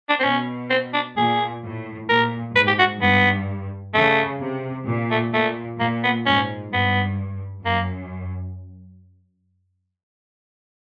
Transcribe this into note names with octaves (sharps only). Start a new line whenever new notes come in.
D4
C4
B2 C#4
C4
D4
A#2 G#4
A2
A#2 A#4
G#2 B4
G4
F#4
G2 B3
C#3 A3
C3
A#2
A3
A#2 A3
A#2 A#3
B3
G#2 C#4
G2 B3
F#2 A#3